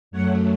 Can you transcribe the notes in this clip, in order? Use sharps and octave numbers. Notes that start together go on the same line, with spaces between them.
F#2 F#3 A3 C#5 F#5